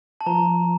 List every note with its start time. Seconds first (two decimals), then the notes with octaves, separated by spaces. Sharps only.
0.21 A5
0.26 F3 A#5